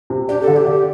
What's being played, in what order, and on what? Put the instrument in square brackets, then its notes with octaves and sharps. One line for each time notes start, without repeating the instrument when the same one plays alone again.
[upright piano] C3
[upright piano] D4 [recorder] G4
[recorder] A4
[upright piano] D3
[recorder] G4
[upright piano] D3